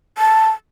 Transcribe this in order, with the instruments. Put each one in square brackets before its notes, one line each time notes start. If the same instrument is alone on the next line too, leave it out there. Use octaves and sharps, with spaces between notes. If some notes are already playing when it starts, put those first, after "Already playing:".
[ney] A5